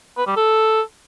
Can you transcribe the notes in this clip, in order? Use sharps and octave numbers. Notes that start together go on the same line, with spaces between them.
B4
G3
A4